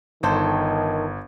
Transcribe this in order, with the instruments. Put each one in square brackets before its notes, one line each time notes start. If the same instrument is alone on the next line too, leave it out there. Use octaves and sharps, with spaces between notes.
[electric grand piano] G1 [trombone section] D#3 [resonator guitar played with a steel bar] A4 C5